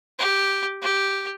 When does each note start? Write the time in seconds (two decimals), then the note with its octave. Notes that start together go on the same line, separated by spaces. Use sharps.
0.19 G4
0.82 G4